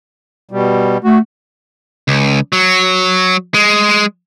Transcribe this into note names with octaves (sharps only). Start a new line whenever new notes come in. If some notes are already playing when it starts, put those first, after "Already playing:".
B2 G3
A3 F#4
C#2
F#3
G#3